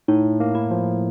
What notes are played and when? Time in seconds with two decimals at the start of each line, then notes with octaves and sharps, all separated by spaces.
0.08 A2 D#4
0.40 A#3
0.55 E4
0.71 F3